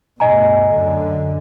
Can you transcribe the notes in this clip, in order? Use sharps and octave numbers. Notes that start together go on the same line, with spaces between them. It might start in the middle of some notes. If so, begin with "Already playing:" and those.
D2 G2 B2 D#5 G#5 A#5
F#2 D3